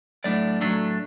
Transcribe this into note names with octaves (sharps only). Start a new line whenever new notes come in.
A2 F#3 A3 D4 D5
A2 F#3 A3 D4